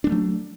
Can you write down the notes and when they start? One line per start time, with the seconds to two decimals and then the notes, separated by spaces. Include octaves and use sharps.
0.04 D4
0.07 G#3
0.09 A3
0.12 F#3